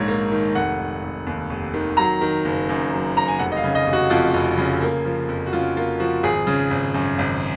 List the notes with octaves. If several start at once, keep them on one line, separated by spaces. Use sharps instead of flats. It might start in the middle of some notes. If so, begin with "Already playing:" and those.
Already playing: A#1 G#2 D#3 C#5
A#3
D#3
F1 F#5
D#3
F1
D#2
F1
D#3
F#3 A#5
D#3
F#1
F#2
F#3
D#3 A#5
G#5
F1 F#5
D#5
F5
C#3
D#5
F1
F#4
F2 F4
F1
C#3
A#3
F3
F2
F#4
C#3 F4
A#3 F4
F3 F#4
G#1 G#4
C#3
G#1
F#2
G#1